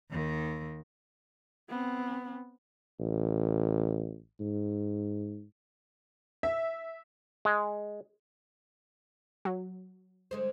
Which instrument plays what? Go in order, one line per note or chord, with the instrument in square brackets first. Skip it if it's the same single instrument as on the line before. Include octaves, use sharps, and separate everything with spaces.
[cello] D#2 D#3
[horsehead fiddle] B3 C4
[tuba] A1
G#2
[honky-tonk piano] E5
[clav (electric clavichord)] G#3
[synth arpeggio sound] F#3
[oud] D3 G#3 C5